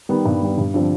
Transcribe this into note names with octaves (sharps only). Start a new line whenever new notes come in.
D#3 G3 B3
G2
D#3 G3 B3
G2
D3 F3 C4